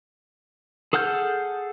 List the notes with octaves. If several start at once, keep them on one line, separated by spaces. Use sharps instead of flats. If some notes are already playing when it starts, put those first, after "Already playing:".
G#4 A4 F#5 F6 G6